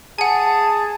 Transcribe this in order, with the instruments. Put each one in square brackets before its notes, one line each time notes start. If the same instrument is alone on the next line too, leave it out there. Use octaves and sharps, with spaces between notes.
[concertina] G#4 [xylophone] F#5 G#5 [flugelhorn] A5